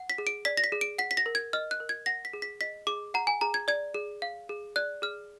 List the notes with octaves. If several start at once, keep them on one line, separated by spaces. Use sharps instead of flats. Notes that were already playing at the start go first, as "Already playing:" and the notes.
Already playing: F#5
B6
G#4
D7
D5 B6
A#6
B6
G#4
D7
F#5 B6
B6
A#6
A#4
G#6
D#5 F6
F#6
A#4
G#6
F#5 A#6
B6
G#4
B6
D#5 B6
G#4 D6
F#5 A#5
G#5
G#4 A#5
G#6
D5 G#6
G#4
F5
G#4
D5 F#6
G#4 F6